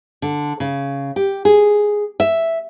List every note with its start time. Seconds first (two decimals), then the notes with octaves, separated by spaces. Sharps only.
0.22 D3
0.60 C#3
1.16 G4
1.45 G#4
2.20 E5